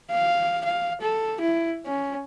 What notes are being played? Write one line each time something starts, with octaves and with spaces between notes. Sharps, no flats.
F5
F5
A4
E4
C#4